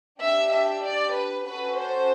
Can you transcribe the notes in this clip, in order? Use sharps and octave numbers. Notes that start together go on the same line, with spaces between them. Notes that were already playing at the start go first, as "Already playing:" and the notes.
D4 G4 E5
E5
D5
B4
C#4 F#4 A4 B4
C5